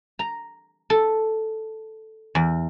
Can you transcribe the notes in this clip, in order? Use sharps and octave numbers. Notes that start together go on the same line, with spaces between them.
A#5
A4
E2